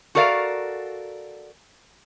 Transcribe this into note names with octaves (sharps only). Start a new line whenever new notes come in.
F#4 A4 A#4 D5 F5